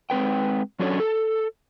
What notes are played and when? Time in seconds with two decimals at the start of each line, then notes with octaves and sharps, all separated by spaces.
0.10 G#3 C4 B4 G5
0.79 F#3 C#4 D4 F#4 A4 C#5
1.00 A4